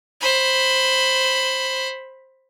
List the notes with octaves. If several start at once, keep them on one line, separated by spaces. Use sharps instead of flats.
C5 B5